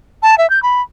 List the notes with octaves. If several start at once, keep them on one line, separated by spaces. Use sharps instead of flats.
A5
E5
G6
B5